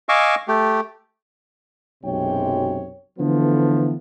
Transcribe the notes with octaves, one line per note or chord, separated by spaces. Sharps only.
D#5 F5 G#5 C#6 D6 E6
A3 G4
B1 F#2 C3 G#3 C#5 G5
D3 E3 F3 A3 B3